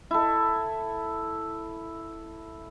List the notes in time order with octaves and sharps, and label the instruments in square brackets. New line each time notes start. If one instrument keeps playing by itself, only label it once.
[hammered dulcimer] E4 A4